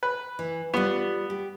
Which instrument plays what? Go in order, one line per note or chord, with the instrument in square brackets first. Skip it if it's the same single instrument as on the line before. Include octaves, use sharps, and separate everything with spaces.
[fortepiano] B4
[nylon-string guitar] E3
[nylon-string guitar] G3 F4 [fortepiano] B3
[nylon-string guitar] G4